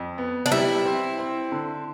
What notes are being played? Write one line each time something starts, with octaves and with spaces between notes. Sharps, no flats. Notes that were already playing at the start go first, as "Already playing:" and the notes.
Already playing: F2
B3
D4
G3 E4
C4
C4
D3